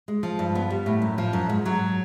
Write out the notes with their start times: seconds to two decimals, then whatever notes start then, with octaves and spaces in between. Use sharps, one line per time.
0.08 G#3
0.23 F3
0.39 G2
0.55 B3
0.70 G3
0.86 A2
1.02 F#2
1.18 F3
1.33 F#2
1.49 G#2
1.65 F#3